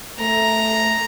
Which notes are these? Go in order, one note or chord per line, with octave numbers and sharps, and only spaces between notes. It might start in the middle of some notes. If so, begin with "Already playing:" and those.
A3 A#5